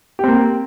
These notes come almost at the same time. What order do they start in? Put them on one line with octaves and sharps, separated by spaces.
G4 C4 A#3